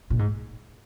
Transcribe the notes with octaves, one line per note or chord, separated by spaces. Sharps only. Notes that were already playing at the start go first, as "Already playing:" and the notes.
A#2
G#2